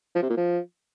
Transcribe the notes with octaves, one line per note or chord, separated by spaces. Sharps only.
F3
C3
A#2
F3